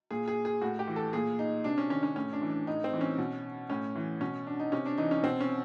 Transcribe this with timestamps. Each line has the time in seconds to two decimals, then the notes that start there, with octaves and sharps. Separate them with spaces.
0.11 A#2 G#4
0.28 G#4
0.45 G#4
0.61 A2 F#4
0.79 G4
0.87 E3
0.96 A4
1.13 A#2 G#4
1.39 D#4
1.64 C3 D4
1.78 C#4
1.90 D#3 C#4
2.03 C#4
2.15 A2 C#4
2.33 D4
2.42 E3
2.50 D4
2.67 A2 D#4
2.84 C4
2.93 E3
3.01 C#4
3.18 B2
3.70 A2 C#4
3.96 E3
4.21 B2 C#4
4.47 D4
4.60 D#4
4.72 C3 C#4
4.86 D4
4.98 E3 D#4
5.11 C#4
5.23 B2 C4
5.41 C#4